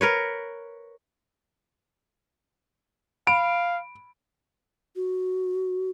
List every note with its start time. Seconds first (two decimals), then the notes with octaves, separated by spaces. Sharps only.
0.01 A#4 B4 C#5
3.27 F5 B5 D7
4.96 F#4